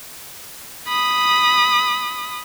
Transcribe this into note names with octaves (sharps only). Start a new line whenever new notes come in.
B5 D#6